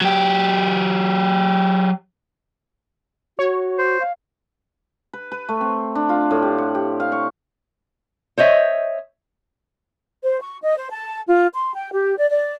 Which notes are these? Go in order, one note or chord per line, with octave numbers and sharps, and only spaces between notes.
F#3 G4
F#4 C#5
C5
F5
B4
B4
A3
C4
D4
F4
A2
G4
F#5
G4
F5
C#6
C5 C#5 D#5 E5
C5
C#6
D#5
C5
A5
F4
C6
G5
G4
D5
D5